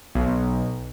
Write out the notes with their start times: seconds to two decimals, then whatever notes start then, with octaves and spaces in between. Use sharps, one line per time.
0.15 B1